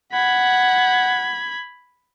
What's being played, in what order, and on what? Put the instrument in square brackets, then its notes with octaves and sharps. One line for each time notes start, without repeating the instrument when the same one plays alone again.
[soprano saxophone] F#5 [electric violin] B5 G#6